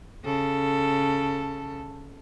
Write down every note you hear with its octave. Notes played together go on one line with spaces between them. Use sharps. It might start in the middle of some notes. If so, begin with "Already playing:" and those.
C#3 A4